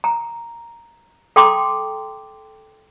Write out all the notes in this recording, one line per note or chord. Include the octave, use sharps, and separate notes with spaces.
A#5
A4 G5 A#5 C6 D6